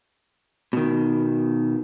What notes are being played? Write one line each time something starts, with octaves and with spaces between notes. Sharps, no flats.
B2 D#3